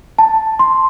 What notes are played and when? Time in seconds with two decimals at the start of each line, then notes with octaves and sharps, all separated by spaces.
0.19 A5
0.59 C6